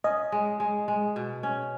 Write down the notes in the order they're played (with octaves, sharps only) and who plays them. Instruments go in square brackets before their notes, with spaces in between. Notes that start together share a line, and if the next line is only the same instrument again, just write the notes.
[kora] C#4 [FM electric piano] D#5
[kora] G#3
G#3
G#3
B2
C#4